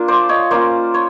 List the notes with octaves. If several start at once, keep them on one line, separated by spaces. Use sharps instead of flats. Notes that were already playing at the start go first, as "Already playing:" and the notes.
Already playing: A#3 D4 F4
C5 D5
C#5 D#5
A#3 C#4 F4 C5 D5
C#5